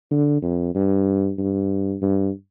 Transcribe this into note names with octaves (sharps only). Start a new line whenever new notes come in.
D3
F2
G2
G2
G2